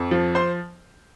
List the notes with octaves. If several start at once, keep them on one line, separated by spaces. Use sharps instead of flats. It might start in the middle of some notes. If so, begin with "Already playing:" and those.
Already playing: F2
F3
C5 C6